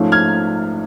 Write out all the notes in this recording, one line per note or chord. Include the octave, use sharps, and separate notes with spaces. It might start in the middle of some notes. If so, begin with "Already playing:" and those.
Already playing: G#2 F3 A3 C#4
F6 G#6